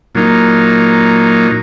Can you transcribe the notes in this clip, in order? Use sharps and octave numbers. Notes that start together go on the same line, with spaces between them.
A#2 F#3 A#3 D#4